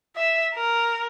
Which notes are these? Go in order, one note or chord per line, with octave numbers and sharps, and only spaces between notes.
E5
A#4